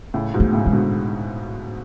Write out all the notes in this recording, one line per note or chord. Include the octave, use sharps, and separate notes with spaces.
A2 C#3
G#2 B2
A3
A2 C#3
G#3
B2 D3